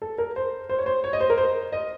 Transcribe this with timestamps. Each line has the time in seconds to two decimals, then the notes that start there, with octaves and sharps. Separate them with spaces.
0.02 A4
0.18 A#4
0.36 C5
0.70 C5
0.79 C#5
0.86 C5
1.04 C#5
1.13 D#5
1.21 C5
1.30 A#4
1.38 C5
1.72 D#5